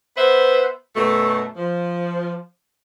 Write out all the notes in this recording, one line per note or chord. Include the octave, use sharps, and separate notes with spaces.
B3 B4 C5 E5 F#5
F#2 B2 A3
F3